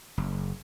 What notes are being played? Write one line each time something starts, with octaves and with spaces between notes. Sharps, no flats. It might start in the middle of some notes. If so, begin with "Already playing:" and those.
F#1